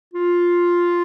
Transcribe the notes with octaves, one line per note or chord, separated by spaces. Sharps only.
F4